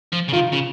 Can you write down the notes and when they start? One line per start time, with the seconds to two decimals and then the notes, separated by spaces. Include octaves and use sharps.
0.13 F3
0.29 C#3
0.33 D#3 F4
0.53 C#3